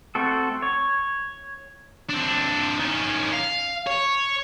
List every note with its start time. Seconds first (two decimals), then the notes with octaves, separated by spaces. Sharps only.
0.15 A3 C4 F#4 A4
0.62 C#5
2.09 C4 D4
2.80 D#3 C#4
3.33 F5
3.87 C#5